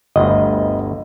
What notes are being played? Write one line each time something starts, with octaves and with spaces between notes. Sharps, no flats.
G1 D2 D#5